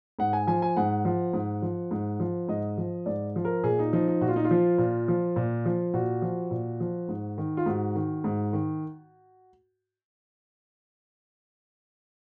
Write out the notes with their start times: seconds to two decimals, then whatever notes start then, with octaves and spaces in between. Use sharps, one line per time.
0.19 G#2 F#5
0.33 G#5
0.47 F3 G#5
0.62 G#5
0.77 G#2 F#5
1.05 F3
1.33 G#2
1.62 F3
1.91 G#2
2.20 F3
2.48 G#2 D#5
2.78 F3
3.06 G#2 D5
3.36 F3
3.45 A#4
3.63 A#2 G#4
3.79 D#4
3.93 F3 D#4
4.08 D#4
4.21 A#2 F#4
4.28 F4
4.36 D#4
4.45 F4
4.51 F3
4.78 A#2
5.08 F3
5.36 A#2
5.66 F3
5.94 A#2 F#4
6.22 F3
6.51 A#2
6.80 F3
7.09 G#2
7.38 D#3
7.57 F4
7.66 G#2 F#4
7.95 D#3
8.24 G#2
8.53 D#3